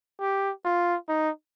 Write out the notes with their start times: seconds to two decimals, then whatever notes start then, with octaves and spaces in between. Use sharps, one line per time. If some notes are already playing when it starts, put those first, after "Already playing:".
0.20 G4
0.65 F4
1.09 D#4